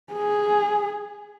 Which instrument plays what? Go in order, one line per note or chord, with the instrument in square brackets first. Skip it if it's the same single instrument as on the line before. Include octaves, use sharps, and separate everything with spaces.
[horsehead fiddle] G#4